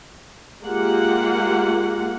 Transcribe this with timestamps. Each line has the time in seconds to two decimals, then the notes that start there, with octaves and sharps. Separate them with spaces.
0.64 G#3 A#3 F4 G4 F#5